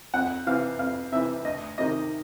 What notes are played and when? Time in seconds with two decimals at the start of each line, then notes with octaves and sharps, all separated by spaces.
0.14 F2 F#5
0.47 C3 E3 F5
0.79 F2 F5
1.12 C3 E3 E5
1.45 D2 D#5
1.78 C3 D#3 D#5